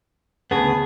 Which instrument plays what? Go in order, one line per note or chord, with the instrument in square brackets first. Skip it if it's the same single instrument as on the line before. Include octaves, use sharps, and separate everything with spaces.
[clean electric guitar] D2 C#3 B3 [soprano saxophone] G#4 [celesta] A5 B5